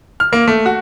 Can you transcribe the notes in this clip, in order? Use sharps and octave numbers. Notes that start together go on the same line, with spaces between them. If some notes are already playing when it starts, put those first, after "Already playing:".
F6
A#3
A3
F#4